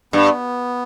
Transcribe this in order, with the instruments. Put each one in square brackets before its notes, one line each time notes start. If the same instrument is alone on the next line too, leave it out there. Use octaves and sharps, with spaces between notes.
[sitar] G2 [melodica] B3